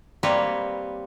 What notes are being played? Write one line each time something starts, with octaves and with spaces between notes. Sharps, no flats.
G3 A#3 C4 B4 C#5